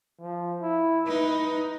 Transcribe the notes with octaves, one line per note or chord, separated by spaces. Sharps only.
F3
E4
D#4 B4